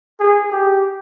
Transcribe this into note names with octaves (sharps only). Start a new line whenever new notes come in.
G#4
G4